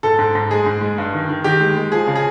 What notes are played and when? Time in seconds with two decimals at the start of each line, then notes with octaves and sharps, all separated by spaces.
0.03 G#2 A4
0.19 G#2
0.35 G#2
0.50 G#3 G#4
0.66 G#2
0.81 G#3
0.98 G2
1.13 D#3
1.29 D#3
1.44 D#3 G4
1.60 G#3
1.77 G#3
1.92 F3 G#4
2.07 C#3
2.16 G#4